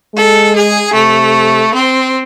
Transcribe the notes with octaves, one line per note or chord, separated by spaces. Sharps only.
G#3 A4
G#4
C3 A3
C4